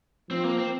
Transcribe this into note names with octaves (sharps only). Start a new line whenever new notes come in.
F3 C4
A#3
C4